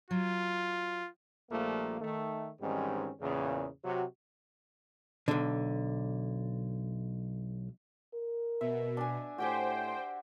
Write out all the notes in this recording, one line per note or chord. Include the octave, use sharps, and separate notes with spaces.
F#3 F4
A#1 F3 G3 A3 A#3
D#3 A3
G#2 D#3 E3 G3 C4 C#4
E2 A#2 C#3
C3 F#3 C4 F#4
B1 D3
A#4
B2 E5
D4 G#5
A2 F#4 G4 C5 G5 G#5